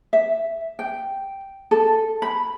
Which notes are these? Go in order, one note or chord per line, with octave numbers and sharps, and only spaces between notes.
E5
G5
A4
B5